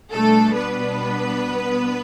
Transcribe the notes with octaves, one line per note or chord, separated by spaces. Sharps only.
B2 G3 A3 D4 A4
B3 B4